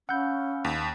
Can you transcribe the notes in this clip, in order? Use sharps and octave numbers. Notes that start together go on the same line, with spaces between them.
C#4 F5 F#5 B5 E6 G6
D#2